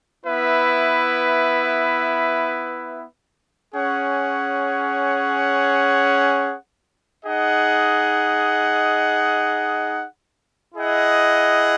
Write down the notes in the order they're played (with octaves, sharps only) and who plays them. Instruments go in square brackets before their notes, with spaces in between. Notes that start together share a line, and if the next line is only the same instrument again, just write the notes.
[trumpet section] B3 E4 B4 E5
C#4 G#4 C#5 F#5
D#4 G#4 D#5 F#5
E4 G#4 D#5 F#5